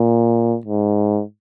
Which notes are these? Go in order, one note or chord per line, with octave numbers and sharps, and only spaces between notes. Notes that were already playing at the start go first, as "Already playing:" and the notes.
Already playing: A#2
G#2